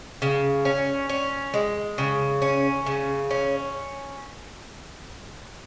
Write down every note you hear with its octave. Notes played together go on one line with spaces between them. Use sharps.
C#3
C#4
C#4
G#3
C#3
C#4
C#3
C#4